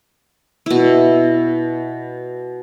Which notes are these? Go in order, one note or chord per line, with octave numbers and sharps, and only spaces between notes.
B2 E4